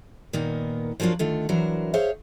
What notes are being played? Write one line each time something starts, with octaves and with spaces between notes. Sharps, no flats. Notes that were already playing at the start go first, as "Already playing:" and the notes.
A#2 D#3 A#3 B3 D#4
F3 F#3 A#3 D4 F4
D3 D#3 A3 F4
E3 F#3 D4 A#4 C5
G#4 C5 C#5 E5 F5